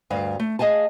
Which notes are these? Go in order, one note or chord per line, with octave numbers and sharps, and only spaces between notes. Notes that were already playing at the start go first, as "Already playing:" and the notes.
D2 G2 F5
A3
G#4 D#5 F5 G#5 A5